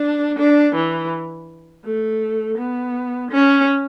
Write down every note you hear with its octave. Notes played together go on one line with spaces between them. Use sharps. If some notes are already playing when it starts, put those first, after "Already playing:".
Already playing: D4
D4
E3
A3
B3
C#4